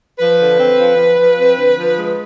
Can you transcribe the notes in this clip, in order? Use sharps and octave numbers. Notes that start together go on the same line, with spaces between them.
F3 B4
D3
C4
F3
F3
F3
C4
D3
F3
G#3